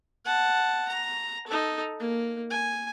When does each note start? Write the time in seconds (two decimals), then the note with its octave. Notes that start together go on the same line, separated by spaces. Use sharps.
0.25 F#5 A5
0.89 A#5
1.47 D#4 A4
2.00 A#3
2.51 G#5